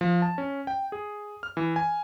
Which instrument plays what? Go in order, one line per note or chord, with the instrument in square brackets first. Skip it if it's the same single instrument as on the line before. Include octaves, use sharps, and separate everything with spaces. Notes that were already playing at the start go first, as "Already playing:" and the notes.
[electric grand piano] F3
A5
C#4
G5
G#4
F6
E3
G#5